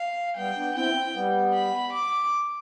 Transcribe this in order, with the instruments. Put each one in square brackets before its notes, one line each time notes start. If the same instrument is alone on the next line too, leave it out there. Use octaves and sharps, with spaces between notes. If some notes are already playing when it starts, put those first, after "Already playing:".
Already playing: [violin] F5
[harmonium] G3 B3 [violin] G5
[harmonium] B3 D4
[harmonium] C4 E4 [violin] G5
[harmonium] G3 B3
[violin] B5
D6